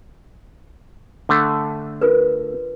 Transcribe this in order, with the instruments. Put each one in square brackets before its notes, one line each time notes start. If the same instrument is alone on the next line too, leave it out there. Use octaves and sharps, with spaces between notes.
[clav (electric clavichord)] D3 A3
[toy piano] F4 A#4 B4